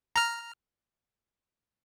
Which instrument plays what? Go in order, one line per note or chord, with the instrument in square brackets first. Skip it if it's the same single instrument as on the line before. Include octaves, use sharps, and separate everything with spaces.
[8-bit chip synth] A#5 F6